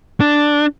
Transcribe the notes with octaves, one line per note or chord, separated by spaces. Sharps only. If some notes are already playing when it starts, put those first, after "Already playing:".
D4